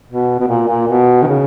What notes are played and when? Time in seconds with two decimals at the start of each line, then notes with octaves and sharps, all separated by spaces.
0.08 B2
0.40 B2
0.48 A#2
0.68 A#2
0.88 B2
1.23 D#3
1.27 C#3